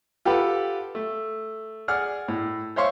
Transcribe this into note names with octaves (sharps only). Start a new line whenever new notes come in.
F4 G4 A4 B4 F#5
A3
G#4 D5 F#5 F6
A2
C5 C#5 E5 F5 C6 C#6